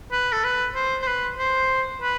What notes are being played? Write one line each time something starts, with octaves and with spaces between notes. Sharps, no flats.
B4
A4
B4
C5
C5
B4
C5
B4